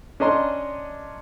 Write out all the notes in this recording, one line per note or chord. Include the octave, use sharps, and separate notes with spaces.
C#4 D4 D#5 A#5 C6